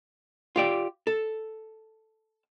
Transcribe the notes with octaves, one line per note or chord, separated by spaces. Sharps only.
F4 G4 D5
A4